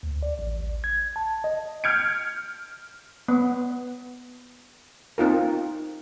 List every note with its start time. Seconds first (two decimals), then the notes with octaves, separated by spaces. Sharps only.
0.03 D2
0.23 D5
0.39 A1
0.84 G#6
1.16 A5
1.44 D#5
1.84 F6 G6 G#6 C#7 D7
3.28 B3
5.18 C4 D#4 F4 A#4